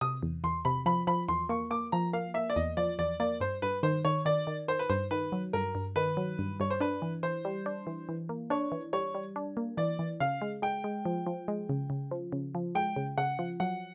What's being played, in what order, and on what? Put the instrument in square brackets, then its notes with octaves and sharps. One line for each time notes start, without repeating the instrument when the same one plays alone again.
[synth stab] C3 [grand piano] D#6
[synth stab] E2
[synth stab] E2 [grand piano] C6
[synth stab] C3 [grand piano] B5
[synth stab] F3 [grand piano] B5
[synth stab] F3 [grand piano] B5
[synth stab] E2 [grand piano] C6
[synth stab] A#3 [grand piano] C#6
[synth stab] A#3 [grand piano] D6
[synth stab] F3 [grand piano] A#5
[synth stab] A#3 [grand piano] F5
[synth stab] A#3 [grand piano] E5
[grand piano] D5
[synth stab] E2 [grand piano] D#5
[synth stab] F3 [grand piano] D5
[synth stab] E2 [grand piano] D5
[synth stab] A#3 [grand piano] D5
[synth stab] G2 [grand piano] C5
[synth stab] G2 [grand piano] B4
[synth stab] D#3 [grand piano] C5
[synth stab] D#3 [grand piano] C#5
[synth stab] D#3 [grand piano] D5
[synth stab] D#3
[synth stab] D#3 [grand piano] C5
[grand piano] B4
[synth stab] G2 [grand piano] C5
[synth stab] D#3 [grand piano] B4
[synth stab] F#3
[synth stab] G2 [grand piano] A#4
[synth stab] G2
[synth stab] D#3 [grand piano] B4
[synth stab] F#3
G2
[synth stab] G2 [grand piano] C#5
[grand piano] C5
[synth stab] D4 [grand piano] B4
[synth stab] E3
[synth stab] E3 [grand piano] C5
[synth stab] G3
D4
E3
E3
A#3
[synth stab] D4 [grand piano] C#5
[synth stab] E3
[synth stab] G3 [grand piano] C#5
[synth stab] G3
D4
A#3
[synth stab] E3 [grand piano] D5
[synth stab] E3
[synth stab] C#3 [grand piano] F5
[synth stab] G#3
[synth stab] G#3 [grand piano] G5
[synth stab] G#3
F3
F3
G#3
C#3
C#3
F3
C#3
F3
[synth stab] G#3 [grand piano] G5
[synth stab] C#3
[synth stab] C#3 [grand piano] F#5
[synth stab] F3
[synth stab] F#3 [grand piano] F#5